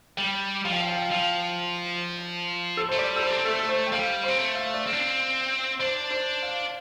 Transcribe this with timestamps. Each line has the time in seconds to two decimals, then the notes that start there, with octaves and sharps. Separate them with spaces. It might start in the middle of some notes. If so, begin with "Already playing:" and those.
0.17 G3 G5
0.65 F3 F5
0.72 G5
0.80 F5
0.88 G5
0.96 F5
1.11 F3 F5
2.77 A4
2.89 A3 C5
2.98 G3 D5
3.16 A4
3.23 C5
3.30 D4
3.38 C4
3.45 A3 A4
3.59 A4
3.69 C5
3.87 G5
3.92 G3 F5
4.23 C4 C5
4.39 A3
4.55 F5
4.74 D5
4.87 C4 F5
4.93 D4
5.00 C4
5.79 D4 C5
6.11 C5
6.43 F5